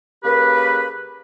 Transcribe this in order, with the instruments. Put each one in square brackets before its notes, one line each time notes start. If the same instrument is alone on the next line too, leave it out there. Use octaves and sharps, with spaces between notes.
[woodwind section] C#3 A#3 G4 A#4 B4